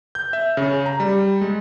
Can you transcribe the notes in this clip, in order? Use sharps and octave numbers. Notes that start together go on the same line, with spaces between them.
G6
E5
C#3
A#5
G3
G#3